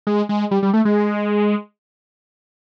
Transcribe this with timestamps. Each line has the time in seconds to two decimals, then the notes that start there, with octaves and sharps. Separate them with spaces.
0.07 G#3
0.29 G#3
0.51 G3
0.63 G3
0.74 A3
0.85 G#3